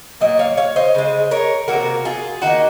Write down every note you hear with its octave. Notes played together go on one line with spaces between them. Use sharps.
A#2 F#3 A#3 D#5
C#5 F5
C#5 F5
C5 D#5
C#3 G#3
A#4 C#5
F#3 A#3 F#4 A#4
C3
F4 G#4
D#3 A#3 D#4 F#4